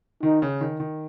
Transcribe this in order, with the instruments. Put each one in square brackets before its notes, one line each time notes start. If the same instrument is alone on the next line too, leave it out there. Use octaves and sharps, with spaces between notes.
[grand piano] D#3 [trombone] D#4
[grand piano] C#3
D#3
D#3